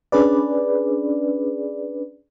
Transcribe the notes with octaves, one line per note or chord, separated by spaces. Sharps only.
C#4 D4 G#4 B4 D5